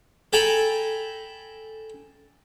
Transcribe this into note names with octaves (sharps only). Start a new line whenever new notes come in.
A4 G5 G#5 A#5 B5